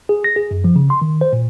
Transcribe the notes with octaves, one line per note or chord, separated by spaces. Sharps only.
G#4
A#6
G#4
F#2
F3
C#3
C6
D#3
C5
A#2